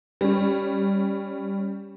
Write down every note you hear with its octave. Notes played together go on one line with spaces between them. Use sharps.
G3 C#4